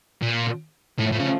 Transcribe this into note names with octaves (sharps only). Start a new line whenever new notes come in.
A#2
A2 F3 A3
A2
C#3